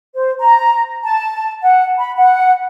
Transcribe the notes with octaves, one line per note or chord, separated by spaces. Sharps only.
C5
A#5
A5
F#5
B5
F#5